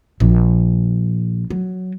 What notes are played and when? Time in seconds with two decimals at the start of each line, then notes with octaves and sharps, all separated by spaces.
0.20 A#1
1.50 F#3